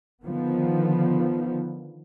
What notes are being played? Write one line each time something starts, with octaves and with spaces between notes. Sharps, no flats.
D3 D#3 F3 B3